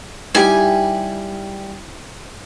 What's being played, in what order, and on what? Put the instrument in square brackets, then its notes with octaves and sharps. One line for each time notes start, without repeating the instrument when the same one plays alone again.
[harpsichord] G3 [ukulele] D#4 E4 G4 [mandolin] G#5